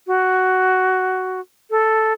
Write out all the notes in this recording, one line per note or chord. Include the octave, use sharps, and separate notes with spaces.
F#4
A4